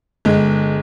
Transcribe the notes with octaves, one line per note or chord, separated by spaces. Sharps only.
G1 G#3